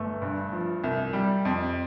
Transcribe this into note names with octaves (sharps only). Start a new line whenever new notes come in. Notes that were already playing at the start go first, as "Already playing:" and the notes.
Already playing: G1 A3
G2
F3
C2
G3
F2